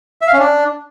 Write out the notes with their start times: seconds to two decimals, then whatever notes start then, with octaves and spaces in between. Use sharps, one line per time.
0.21 E5
0.27 F5
0.33 C#4
0.39 D4